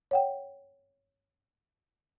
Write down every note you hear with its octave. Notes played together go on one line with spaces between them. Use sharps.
C#5 F#5 G5